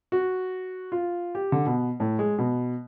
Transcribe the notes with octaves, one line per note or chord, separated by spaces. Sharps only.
F#4
F4
G4
D3
B2
A2
G#3
B2